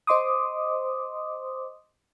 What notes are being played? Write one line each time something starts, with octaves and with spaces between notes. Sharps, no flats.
C5 D#5 C6 D6 D#6